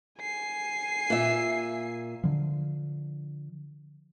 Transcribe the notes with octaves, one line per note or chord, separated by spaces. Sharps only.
G#5 C7
A#2 E5
D3 F3